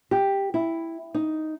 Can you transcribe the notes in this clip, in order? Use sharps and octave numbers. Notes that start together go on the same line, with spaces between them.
G4
E4
D#4